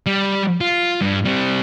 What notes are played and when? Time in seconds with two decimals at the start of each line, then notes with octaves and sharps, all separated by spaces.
0.06 G3
0.61 F4
1.01 G2
1.25 G3 C4